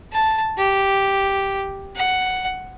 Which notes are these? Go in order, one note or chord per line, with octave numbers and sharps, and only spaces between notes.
A5
G4
F#5